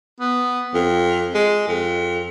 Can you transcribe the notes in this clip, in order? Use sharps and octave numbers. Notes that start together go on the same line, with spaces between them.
B3
F2
G#3
F2